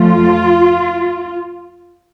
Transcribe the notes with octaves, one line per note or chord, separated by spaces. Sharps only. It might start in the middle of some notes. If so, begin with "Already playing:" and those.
Already playing: F2 F3 A3 F4